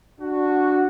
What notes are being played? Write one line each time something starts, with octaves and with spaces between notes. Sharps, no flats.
D4 F#4